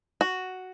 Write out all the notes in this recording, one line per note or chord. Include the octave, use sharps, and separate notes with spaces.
F#4